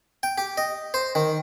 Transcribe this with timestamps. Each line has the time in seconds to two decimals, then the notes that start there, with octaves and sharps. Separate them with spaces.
0.23 G5
0.38 G4
0.58 D#5
0.94 C5
1.15 D#3